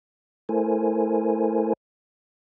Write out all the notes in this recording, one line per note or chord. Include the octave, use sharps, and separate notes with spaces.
A3 E4 A4 A#4 C5 G#5